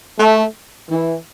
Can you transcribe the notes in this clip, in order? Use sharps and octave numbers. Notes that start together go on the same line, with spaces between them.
A3
E3